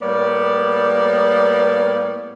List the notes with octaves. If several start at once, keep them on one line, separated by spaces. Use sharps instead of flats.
A2 G3 A#3 B3 C#5 D5